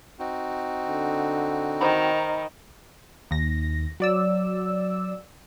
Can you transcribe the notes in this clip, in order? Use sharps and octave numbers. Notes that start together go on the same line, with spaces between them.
C4 D#4 F#4
D3
D#3 C5 A#5 B5
D#2 A#6
F#3 D5 E6